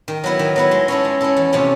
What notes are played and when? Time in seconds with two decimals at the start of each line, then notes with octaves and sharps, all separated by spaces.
0.08 D#3
0.24 F#3 B3 E4
0.39 D#3
0.56 F#3 B3 E4
0.71 G#3
0.88 C#4 E4 A4
1.05 G#3
1.21 C#4 E4 A4
1.37 E2
1.53 C3 F3 A3 C#4